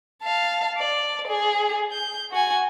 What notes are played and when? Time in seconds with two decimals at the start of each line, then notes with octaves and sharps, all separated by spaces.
0.23 F5 A5
0.78 D5
1.28 G#4
1.92 G6
2.32 F#4 G#5